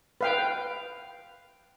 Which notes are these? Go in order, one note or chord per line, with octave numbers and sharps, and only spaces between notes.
B4 F5 G5